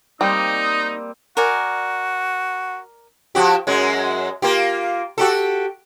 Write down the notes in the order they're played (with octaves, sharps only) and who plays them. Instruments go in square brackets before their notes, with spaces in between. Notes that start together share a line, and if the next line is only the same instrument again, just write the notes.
[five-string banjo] G3 [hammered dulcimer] A#3 C4 [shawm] D#4 [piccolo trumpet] D#6
[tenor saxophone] F#4 [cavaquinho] A#4 D5 G#5
[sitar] F3 F#4 G4
F#2 F#3 G#3
A#3 F4 G4
F#4 G4 A4